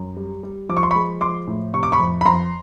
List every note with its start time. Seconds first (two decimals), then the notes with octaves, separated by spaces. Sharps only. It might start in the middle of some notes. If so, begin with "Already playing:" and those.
Already playing: F#2
0.17 G3
0.43 G3
0.69 F3 D6
0.77 C#6
0.83 C6
0.91 B5 C#6
0.95 G#3
1.21 F3 C6 D6
1.47 A2
1.73 C3 C#6
1.83 D6
1.92 B5 C#6
1.99 F2
2.21 B5
2.25 F2 A#5 C6